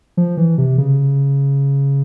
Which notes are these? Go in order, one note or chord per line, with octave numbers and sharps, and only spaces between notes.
F3
E3
C3
C#3